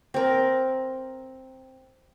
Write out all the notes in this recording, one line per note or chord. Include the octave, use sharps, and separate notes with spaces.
C4 A#4